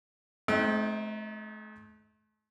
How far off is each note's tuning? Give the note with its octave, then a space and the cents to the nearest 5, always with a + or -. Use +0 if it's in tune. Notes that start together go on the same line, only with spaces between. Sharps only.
A3 -40 C4 +0 D#4 +5